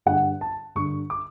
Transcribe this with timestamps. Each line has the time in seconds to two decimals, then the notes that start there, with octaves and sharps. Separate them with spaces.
0.06 G2 D3 F#5
0.41 A5
0.75 G2 D3 C#6
1.10 D6